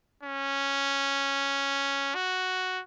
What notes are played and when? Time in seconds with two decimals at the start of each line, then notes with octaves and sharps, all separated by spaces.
0.23 C#4
2.15 F#4